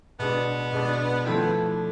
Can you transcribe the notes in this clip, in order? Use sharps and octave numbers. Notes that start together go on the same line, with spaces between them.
B2 G#3 B3 D4
B2 G#3 D4
F3 A3 C4 E4
B3
E3
D3